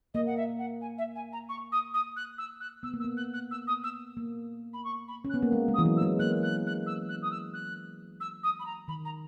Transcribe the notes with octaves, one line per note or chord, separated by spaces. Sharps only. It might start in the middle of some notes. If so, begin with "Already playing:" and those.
A#3 D#5
F#5
E5
F#5
G#5
E5
G#5
A#5
C#6
D#6
D#6
F#6
E6
F#6
B3 E6
A#3
E6
B3
F#6
F#6
E6
D#6
E6
A#3
B5
C#6
B5
C#4
F#6
B3
A#3
G#3
G#3
D#6
E3
F#3
E6
G#3
A#3 F#6
F#6
F#6
E6
F#6
D#6
E6
F#6
E6
D#6
B5
A#5
D#3 B5
A#5